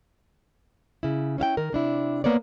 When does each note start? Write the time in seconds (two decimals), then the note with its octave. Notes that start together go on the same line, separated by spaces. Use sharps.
1.03 C#3 E4
1.38 C#4 E4 F5 G5
1.57 D#3 A#4
1.73 C3 D4 E4
2.24 A#3 B3 C#5 D5